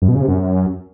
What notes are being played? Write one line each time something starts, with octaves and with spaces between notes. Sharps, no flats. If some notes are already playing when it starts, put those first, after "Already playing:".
F#2
B2
C#3
C3
F#2